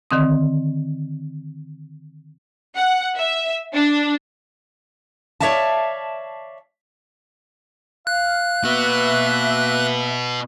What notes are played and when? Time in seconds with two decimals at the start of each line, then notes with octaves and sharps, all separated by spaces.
0.11 D3 D#3 C4 D#6
2.77 F#5
3.17 E5
3.73 D4
5.40 C#5 D5 E5 F5 A5
8.07 F5 F#6
8.64 B2 A#3 B3 B4 E5